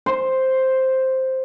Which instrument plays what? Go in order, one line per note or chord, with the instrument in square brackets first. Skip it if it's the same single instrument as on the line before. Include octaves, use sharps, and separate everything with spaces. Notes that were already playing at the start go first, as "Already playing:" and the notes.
[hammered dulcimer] C5